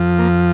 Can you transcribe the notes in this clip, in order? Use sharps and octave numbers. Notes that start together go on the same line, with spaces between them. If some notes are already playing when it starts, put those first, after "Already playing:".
Already playing: F2 F3
A#3